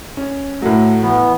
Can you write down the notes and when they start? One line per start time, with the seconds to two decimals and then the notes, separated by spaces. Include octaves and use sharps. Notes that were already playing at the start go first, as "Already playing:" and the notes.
0.17 C#4
0.62 A2 F#3 A3
1.02 E3 B3